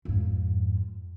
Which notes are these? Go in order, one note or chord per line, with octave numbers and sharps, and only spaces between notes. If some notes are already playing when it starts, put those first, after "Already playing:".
F2 G#2